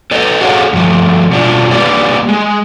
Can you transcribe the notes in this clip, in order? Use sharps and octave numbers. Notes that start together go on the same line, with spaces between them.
A4 B4 D#5
F#4 G#4 A4 C#5 F5 F#5
G2 F3 A3
B2 G3 D4 F4
G3 A#3 G4 B4 D5
G#3